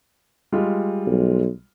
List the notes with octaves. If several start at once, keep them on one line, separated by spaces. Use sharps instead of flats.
G3 G#3 F4
B1